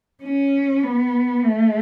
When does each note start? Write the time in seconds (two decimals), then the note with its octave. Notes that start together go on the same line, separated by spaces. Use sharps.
0.23 C#4
0.83 B3
1.45 A3